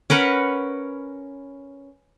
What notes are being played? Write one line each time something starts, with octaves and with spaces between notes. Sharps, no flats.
C#4 A#4 B4 F#5